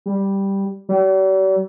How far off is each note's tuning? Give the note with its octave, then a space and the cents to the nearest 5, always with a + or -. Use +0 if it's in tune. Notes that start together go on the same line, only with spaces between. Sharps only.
G3 +0
G3 -45